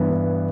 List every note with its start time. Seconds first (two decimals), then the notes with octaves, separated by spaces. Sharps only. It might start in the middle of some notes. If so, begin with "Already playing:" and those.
Already playing: G2 E3 B3
0.10 G2